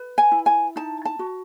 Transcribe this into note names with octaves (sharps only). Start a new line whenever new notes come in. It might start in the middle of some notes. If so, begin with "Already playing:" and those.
Already playing: B4
G#5
E4
G#5
D#4 A5
A5
F#4